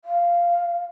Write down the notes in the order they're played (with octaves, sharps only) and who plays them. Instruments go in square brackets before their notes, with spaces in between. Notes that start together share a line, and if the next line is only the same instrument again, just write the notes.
[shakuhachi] F5